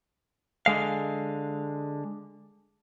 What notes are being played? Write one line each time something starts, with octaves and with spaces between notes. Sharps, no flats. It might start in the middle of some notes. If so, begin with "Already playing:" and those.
D3 G#3 F5